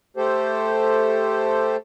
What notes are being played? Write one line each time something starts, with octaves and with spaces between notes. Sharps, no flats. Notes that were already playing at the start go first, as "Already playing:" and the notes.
A3 G4 A4 C5